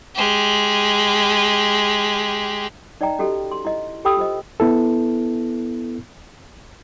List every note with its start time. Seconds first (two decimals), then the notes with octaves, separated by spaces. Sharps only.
0.15 G#3 G4
3.01 D#4 D5 D#5 G5 A#5
3.19 C#4 F#4 G4 A4 D#5
3.52 C6
3.65 E4 D#5
4.05 G4 A4 G5 B5 D#6 E6
4.17 F4 C5 D#5
4.60 B3 E4 A4